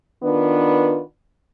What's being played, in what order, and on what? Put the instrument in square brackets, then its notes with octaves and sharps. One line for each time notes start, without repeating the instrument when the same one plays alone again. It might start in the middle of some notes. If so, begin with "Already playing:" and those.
[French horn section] D#3 B3 D4 F4 B4